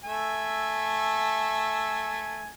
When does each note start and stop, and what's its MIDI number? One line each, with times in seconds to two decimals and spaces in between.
0.04 2.49 57
0.04 2.49 76
0.04 2.49 80